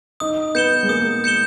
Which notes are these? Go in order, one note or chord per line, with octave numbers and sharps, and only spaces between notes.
D#4 D#6
B3 G6 C#7 E7 G7
G#3
A#3 D#6
G6 C#7 E7 G7